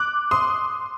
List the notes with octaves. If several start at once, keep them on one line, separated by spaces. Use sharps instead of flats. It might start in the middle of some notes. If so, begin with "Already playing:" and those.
Already playing: D6 F#6
C6 D#6